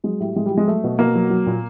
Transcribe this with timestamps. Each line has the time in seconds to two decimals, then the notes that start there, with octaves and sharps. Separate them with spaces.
0.04 F#3 G#3
0.20 A2 G3
0.35 A2 G#3
0.46 G3
0.51 F#3
0.58 G#3
0.67 F#3 A3
0.84 B2
0.99 B2 A#3
1.15 F#3
1.30 F#3
1.47 A#2